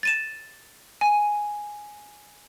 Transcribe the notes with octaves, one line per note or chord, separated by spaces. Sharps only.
A6 D#7 E7
G#5